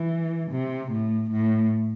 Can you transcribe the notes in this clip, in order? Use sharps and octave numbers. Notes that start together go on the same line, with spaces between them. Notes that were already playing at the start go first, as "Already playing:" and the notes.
Already playing: E3
C3
A2
A2